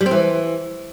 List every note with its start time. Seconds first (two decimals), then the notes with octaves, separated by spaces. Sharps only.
0.01 G3
0.06 C4
0.11 E3